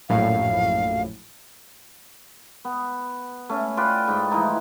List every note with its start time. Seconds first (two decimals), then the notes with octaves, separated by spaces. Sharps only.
0.09 A#1 F#2 A2 F5
2.65 B3
3.49 A3 C#4
3.77 F4 B4 D5 G5
4.08 G#2 G5
4.31 E3 F3 A3 D#4